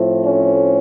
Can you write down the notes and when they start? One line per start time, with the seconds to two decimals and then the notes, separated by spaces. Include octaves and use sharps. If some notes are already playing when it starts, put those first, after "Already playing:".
Already playing: A2 F3 A3 C4
0.24 C#4